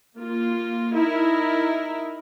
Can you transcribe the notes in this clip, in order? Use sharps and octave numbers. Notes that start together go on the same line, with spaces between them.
A#3 F4
D#4 E4 A#4